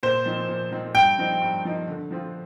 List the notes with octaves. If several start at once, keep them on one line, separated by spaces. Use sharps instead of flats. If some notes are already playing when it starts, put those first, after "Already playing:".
A#2 C5
F3 C4 D#4
A#2
F3 C4 D#4
G2 G5
F3 C4 D#4
G2
F3 C4 D#4
D3
F3 C4 F4